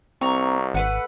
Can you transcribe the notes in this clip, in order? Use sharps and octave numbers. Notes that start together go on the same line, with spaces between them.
C2 C4 A#5 C#6
G#1 A3 B4 F#5